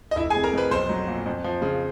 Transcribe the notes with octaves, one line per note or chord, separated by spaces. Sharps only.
D#5
F1 E4 E5
G#4 G#5
C3
A#4 A#5
F2 B4 B5
B1 C5 C6
F#3
A#2
F2
F3
C#3